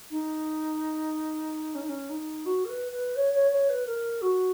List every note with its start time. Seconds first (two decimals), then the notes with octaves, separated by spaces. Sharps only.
0.10 D#4
1.74 C#4
1.81 D#4
1.88 C#4
2.09 D#4
2.45 F#4
2.64 A#4
2.68 B4
2.91 B4
3.15 C#5
3.32 C#5
3.50 C#5
3.68 B4
3.86 A#4
4.21 F#4